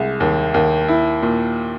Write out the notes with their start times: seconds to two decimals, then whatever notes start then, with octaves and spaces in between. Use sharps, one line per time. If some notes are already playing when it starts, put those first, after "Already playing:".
Already playing: C2 G#3
0.20 D#2
0.54 D#2
0.88 E4
1.23 A#2